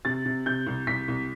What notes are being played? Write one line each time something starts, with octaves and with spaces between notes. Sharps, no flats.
C3 A6
C3
C3 G6
C2
C2 B6
C2